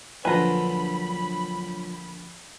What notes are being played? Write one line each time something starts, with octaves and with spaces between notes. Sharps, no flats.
A#1 D3 F#3 F4 B4 G#5 A#5 B5